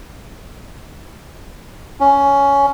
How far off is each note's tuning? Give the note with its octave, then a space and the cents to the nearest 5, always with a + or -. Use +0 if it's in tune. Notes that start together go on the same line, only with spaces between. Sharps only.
C#4 +10